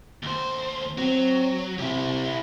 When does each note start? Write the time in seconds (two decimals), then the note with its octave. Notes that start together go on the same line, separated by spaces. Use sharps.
0.23 D#2 C5
0.98 F#3 C4
1.79 C3 G3 E4